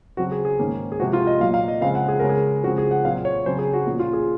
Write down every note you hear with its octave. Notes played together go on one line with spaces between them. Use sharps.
C#3 F#3 C4 F#4
G#4
G#4
G#2 D#3 A#3 C#4
G#4
C3 F3 G#3 F#4
F4
D#5
A#2 F#3 A#3 F5
F5
D#5
C#3 F3 G#3 C4 F5
F#5
G#4
C#3 G#3 C#4 A#4
G#4
C#3 F3 G#3 C4 F#4
G#4
F#5
A#2 F#3 C4 F5
C#5
C#3 F#3 C4 C5
G#4
F#4
A#2 F3 A#3 C#4
F4
G#4